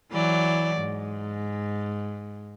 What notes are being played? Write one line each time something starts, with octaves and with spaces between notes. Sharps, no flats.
E3 F#3 D5
G#2